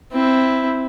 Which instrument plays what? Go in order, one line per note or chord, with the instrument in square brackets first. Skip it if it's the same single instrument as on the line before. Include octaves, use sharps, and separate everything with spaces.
[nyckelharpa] C4 E4